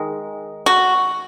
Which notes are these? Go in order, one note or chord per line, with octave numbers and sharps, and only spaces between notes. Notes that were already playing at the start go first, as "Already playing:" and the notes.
Already playing: D#3 G#3
F#4